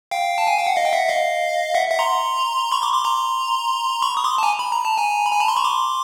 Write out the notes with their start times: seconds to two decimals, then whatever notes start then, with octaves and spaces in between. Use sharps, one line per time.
0.11 F5 G5
0.38 A5
0.47 G#5
0.57 G5
0.67 F#5
0.77 D#5 F5
0.85 G5
0.93 E5 F#5
1.09 D#5 F5
1.74 E5 F#5
1.91 E5 F#5
1.99 A#5 C6
2.72 B5 C#6
2.82 C6 D6
2.94 C6 D6
3.05 A#5 C6
4.02 B5 C#6
4.17 D#6
4.24 C6 D6
4.38 A5
4.43 G#5 A#5
4.59 B5
4.72 A#5
4.85 A5
4.97 G#5 A#5
5.26 B5
5.32 G#5 A#5
5.40 A5 B5
5.48 A#5 C6
5.57 B5 C#6
5.64 C6 D6